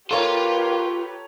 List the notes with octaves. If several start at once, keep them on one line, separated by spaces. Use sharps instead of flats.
A#3 F4 G4 A4 B4 C#5 A#5 C6